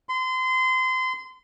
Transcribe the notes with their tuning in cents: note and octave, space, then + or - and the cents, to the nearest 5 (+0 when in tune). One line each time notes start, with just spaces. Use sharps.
C6 -30